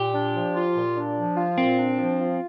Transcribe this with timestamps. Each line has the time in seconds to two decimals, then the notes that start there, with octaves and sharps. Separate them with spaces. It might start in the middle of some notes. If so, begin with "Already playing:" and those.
Already playing: A#2 G4
0.14 D4
0.35 F3
0.55 F4
0.76 A#2
0.96 D4
1.16 F3
1.37 F4
1.58 A#2 C4
1.78 D4
1.98 F3
2.19 F4